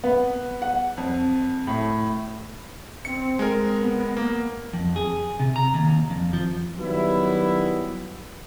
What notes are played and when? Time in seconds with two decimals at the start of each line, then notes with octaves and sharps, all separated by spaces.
0.04 B3
0.62 F#5
0.97 F2
1.67 A2
3.05 C4 C#7
3.39 G#3 A#4
3.79 B3
4.17 A#3
4.73 F2
4.96 G#4
5.40 C3
5.56 A#5
5.74 D#2
6.10 F2
6.33 F3
6.79 D#3 F#3 G3 B3 E4